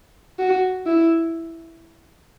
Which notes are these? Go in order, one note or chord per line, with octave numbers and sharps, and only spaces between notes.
F#4
E4